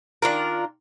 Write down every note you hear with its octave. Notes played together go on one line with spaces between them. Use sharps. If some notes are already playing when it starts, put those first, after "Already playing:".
D#3 D4 F4 A#4